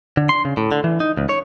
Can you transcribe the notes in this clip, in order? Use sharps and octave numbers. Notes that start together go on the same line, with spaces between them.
D3
C6
C#3
A2
D3
E3
D#4
C#2
C#5